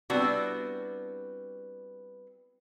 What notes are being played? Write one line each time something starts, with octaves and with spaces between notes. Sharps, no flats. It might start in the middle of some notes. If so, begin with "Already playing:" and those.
G3 B3 C4 D4 E4 F#4